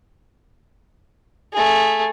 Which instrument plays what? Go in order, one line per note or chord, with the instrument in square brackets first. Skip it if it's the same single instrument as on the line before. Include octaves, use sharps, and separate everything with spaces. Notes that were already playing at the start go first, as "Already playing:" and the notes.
[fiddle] A3 G#4